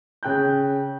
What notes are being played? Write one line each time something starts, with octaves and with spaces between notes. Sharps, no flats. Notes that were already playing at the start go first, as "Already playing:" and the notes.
C#3 G5 F#6 G6